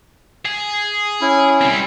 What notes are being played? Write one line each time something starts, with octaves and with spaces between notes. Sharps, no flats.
G#4
C#4 E4
G3 C4